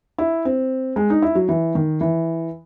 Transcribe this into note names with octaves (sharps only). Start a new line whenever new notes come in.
E4
C4
G#3
D#4
E4
F#3
E3
D#3
E3